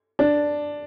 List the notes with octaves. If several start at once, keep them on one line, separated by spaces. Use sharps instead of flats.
D4